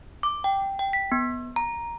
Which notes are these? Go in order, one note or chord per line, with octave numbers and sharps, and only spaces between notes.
D6
G5
G5
B6
B3
A#5